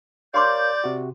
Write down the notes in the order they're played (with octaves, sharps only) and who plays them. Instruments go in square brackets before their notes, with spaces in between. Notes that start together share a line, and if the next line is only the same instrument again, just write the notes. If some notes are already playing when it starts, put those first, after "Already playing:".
[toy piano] G4 C6 D6 [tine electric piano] A#4 C#5 F5 [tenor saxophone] D5 [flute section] G6
[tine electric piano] C3 F#4